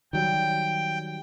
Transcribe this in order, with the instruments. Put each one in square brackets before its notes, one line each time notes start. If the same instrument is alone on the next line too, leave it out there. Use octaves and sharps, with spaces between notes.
[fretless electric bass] D#3 F#3 G3 [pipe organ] G5